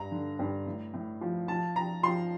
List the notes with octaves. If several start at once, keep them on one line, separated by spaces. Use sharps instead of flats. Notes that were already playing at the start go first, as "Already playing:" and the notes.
Already playing: G2 A#5
D3
G2
A2
A2
F3
F3 A5
F3 A#5
F3 C6